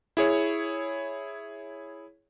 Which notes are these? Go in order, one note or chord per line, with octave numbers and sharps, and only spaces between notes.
E4 G#4 C#5